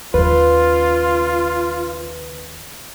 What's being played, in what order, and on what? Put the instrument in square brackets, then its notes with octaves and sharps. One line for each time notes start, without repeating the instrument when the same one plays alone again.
[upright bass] D#2 C#3 [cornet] F4 [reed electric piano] B4